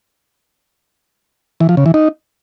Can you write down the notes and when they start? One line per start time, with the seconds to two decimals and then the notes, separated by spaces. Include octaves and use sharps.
1.60 E3
1.69 F3
1.77 C#3
1.86 E3
1.94 D#4